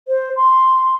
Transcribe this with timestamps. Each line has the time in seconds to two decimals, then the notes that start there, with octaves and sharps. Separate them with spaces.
0.08 C5
0.36 C6